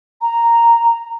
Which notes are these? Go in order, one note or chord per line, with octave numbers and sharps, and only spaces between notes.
A#5